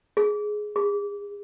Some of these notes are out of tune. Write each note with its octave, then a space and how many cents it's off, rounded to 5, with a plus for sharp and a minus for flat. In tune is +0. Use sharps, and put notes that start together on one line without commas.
G#4 +10
G#4 -35